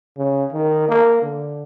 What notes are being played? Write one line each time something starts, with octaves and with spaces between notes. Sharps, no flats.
C#3
D#3
A#3
D3